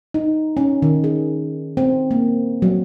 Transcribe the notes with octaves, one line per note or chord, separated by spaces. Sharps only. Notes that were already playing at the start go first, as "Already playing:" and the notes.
D#4
C#4
D#3
G#4
C4
A#3
F#3